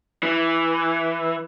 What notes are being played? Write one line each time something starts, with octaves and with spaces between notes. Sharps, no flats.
E3